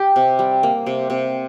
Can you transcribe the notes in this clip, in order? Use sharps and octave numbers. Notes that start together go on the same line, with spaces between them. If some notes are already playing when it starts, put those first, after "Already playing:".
Already playing: G4
C3
G3
A#3
C3
C3